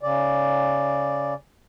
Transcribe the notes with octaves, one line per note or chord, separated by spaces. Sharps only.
C#3 D5